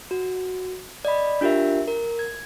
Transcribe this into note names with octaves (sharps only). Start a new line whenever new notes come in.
F#4
D5 D#5 B5
D4 F4 G4 A#4 E5
A#4
G#6